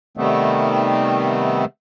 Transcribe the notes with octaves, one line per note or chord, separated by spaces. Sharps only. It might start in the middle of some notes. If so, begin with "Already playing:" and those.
C3 D#3 G3 A3 B3 C4